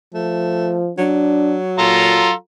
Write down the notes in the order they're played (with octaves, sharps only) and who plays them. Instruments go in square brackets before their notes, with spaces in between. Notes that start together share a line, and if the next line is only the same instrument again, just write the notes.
[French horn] F3 [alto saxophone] A3
[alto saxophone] F#3 [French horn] D4
[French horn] A#2 [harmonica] F4 A4 A#5